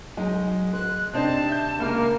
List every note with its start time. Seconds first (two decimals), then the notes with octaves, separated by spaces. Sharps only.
0.17 F#3 G#3 D#4 G#5
0.73 C5 F#6
1.14 C3 C4 D4 D#4 C5 A5
1.48 E5 G6
1.80 C#2 A#3 F6